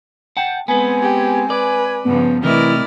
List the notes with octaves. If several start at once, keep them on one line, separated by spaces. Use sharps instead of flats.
F#5 G5 A5
G#3 B3 C4 B4 G#5
G4
B4 D5
G2 C#3 F3 B3
C3 E3 A3 E4 A#4 D5 D#5 F6